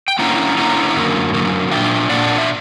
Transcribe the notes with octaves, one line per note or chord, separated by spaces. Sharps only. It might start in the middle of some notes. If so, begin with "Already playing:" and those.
G5
D3 A#3 C#4 E4 F#5 A#5
D3 A#3 C#4 E4 F#5 A#5
F#2 D3 F#3 A#3
F#2 D3 F#3 A#3
A#2 A#3 D4 E5 G5
A#2 A#3 D4 D5 F#5
E5